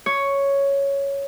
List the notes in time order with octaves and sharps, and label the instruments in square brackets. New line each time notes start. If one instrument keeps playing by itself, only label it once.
[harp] C#5